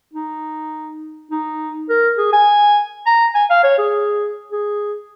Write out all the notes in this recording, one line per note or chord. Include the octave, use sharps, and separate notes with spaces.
D#4
D#4
A#4
G#4
G#5
A#5
G#5
F5
C#5
G#4
G#4